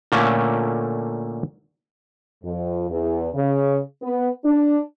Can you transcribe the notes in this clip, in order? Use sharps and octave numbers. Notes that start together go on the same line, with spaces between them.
A#2 D3 A3 A#3 C#4
F2
E2
C#3
B3
D4